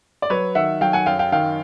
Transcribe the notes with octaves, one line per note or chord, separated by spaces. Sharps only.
D5
F#3 B4 C#5
D#3 E5 F#5
F#3 F5 G5
F#5 G#5
F#2 F5 G5
F5 G5
D#3 F5 G5